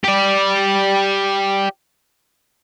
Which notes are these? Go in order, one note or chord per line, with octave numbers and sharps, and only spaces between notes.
G4 D5